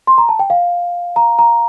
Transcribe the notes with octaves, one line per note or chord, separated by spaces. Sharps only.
C6
A#5
A5
G5
F5
A#5
A#5